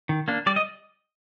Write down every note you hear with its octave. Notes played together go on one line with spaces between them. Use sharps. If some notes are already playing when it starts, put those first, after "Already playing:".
D#3
A#3 D4
G3 D5
D#5